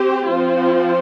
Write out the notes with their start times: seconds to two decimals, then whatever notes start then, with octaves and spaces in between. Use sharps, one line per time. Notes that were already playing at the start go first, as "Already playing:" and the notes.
Already playing: C4 G4 C5
0.29 F3 C4 F4 C5